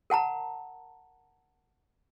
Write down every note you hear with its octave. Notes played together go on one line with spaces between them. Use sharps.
A#4 F#5 A5 A#5